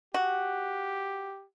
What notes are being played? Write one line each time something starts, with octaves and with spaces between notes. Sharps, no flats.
F#4 G4